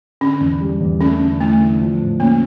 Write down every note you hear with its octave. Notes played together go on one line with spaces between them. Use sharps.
D3 C#4
E2
G3
E2
A3 C#4
D3
A3 E4
D3
F3
A2
A#3 C#4